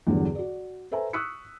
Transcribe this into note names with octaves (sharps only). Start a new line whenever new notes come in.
E2 G2 D3 F#3
F#4 D5
A4 B4 C5 E5 G#5 A#5
C#6 D#6 E6 F#6 B6 C#7